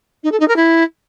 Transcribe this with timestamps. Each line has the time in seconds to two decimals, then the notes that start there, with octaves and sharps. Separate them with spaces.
0.24 D#4
0.32 A4
0.40 D#4
0.48 A#4
0.56 E4